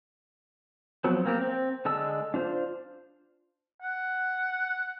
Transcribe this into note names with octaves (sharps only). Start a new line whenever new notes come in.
F3 F#3 B3 C4
A#3 C4 G4
C4
D3 G#3 A5 E6
D4 F4 C5
F#5